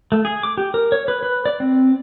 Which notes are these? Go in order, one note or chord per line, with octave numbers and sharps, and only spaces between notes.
A3
G#4
D6
G4
A#4
C#5
B4
B4
D5
C4